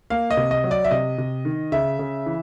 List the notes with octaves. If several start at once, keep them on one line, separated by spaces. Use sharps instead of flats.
A#3 F5
D#5
C3
D#5
F#3
D5
E5
C3 D#5
C3
D#3
C#3 E5
C#3
E3